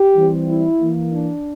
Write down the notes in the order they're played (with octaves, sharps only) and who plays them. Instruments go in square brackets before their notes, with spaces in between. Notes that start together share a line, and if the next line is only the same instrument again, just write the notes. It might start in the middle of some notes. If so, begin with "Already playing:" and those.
Already playing: [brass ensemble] G4
E3 G3 C4
E4
E3 A#3
D4